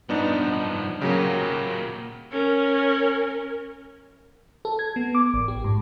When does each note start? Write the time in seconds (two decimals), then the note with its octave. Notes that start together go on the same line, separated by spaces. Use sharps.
0.09 G2 F3 B3 D4 D#4
1.02 A#2 C#3 F#3 A#3 G4
2.31 C#4 A#4
4.65 A4
4.79 G#6
4.96 B3
5.15 D6
5.34 A1
5.48 G4
5.64 G#2